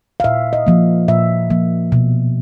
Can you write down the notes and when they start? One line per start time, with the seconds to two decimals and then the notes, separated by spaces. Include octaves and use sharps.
0.20 F5
0.24 A#2 E5
0.53 D#5
0.67 F3 A#3
1.08 A#2 E5
1.50 F3 A#3
1.92 B2